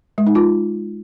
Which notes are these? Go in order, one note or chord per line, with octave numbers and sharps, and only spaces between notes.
G#3
D#4
F4